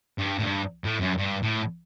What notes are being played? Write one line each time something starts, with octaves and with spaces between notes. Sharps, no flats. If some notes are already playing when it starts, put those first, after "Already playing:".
G2
A2
G2
A2
F#2
G2
A2